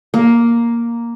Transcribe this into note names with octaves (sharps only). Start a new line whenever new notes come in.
A#3